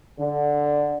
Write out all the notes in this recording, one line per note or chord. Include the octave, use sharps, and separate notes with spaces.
D3